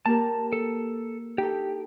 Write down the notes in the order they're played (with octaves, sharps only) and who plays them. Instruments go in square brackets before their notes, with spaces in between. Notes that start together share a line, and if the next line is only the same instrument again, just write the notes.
[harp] A#3 G4 A#4 [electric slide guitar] A5
[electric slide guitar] A4
[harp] D#4 A4 [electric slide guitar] G4